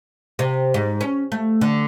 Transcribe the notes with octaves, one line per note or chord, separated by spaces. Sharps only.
C3
G#2
C#4
A3
D3